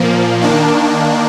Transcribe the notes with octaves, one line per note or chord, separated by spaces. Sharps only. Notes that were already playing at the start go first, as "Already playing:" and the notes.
Already playing: A#2 F3 A#3
D#3 A#3 D4